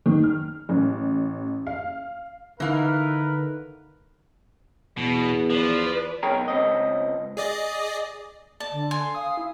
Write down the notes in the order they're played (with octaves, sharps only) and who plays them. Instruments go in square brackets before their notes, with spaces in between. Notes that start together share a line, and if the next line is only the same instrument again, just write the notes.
[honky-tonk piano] D#3
F6
A1
F5
[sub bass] D3 [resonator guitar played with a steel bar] E3 F5 [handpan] D#4 [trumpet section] A#4 B4
[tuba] E2 [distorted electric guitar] B2
[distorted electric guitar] F3 [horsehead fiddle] B4 D5
[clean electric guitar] B1 G#4 A#4 C#5 G5 A#5
C#2 C4 D#5
[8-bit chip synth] G#4 D5 D#5
[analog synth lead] D5 [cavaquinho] A5
[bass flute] D3
[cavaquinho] G#5 [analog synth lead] C6
[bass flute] F5 [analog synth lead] D#6
[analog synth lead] E4